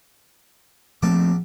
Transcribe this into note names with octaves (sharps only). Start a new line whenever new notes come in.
A#1 F3 A3 C4 A5 D6